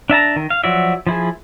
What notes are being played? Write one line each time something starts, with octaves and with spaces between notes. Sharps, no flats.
D4 E5 A5 A#5
D#3
F5
F3 F#3 F#4 D5 E5
F3 E4 G#4